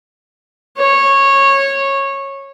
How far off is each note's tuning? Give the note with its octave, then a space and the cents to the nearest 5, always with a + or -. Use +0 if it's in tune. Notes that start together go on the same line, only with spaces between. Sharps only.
C#5 -15